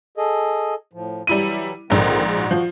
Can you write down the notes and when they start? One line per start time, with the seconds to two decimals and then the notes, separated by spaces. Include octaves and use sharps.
0.17 G#4 A4 D#5
0.93 A2 F3
1.27 E3 F#3 G3 E4 D#7
1.90 A#1 G#2 D3 D#3 C4
2.36 F#4
2.51 F3